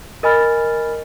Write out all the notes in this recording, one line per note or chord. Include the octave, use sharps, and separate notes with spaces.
A#4 D#5 G#5 B5 F6 A6